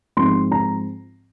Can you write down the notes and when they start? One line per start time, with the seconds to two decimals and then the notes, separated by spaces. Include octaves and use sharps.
0.17 G#2 F3 G#3 C4 C6
0.51 A#5